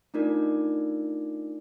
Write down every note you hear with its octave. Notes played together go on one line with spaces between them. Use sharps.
A3 D4 D#4 F4 A#4 D5